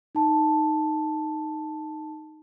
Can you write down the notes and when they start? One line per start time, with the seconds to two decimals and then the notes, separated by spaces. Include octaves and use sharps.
0.15 D#4 A5